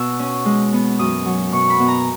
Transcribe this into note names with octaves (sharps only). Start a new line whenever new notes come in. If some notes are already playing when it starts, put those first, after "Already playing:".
Already playing: B2 E6
C#4
G#3
B3
F#2 D#6
F#3
B2 C#6
B5
B2
A#5